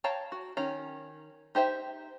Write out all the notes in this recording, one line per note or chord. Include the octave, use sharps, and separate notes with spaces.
C#5 F5 G5 A5 A#5
F#4
D#3 C#4 A#5
D#4 G4 C5 E5